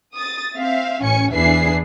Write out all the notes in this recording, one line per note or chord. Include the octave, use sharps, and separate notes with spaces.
D#6 A6
C4 E5 F5
A1 C#4 G#5 C#7
E2 D4 G#4 B4 E5 C7